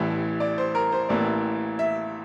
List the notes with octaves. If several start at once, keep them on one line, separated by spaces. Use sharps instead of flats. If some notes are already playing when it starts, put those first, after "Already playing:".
Already playing: A1 A2 E3 G3
D5
C5
A#4
C5
A1 A2 E3 A#3 D5
E5